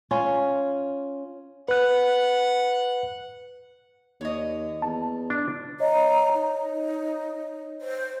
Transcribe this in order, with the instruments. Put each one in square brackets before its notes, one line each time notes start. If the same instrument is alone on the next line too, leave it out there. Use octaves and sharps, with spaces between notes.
[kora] C#4 F4
[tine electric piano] B4 F#6 [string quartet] F#5
[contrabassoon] D#2 [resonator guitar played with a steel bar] C#5 D#5
[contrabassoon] E2 [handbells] A5
[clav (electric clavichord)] D4
[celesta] C#5 D#5 [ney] A#5
[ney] D#4
C5